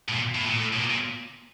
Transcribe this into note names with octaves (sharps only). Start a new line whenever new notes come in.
A2
A#2
A2
A#2
A2
B2
A#2
A#2